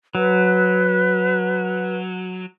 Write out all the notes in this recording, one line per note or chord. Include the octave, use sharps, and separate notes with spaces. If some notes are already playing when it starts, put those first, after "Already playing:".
F#3 B4